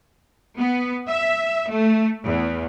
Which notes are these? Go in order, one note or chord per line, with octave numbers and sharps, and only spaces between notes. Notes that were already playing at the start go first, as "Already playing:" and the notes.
B3
E5
A3
E2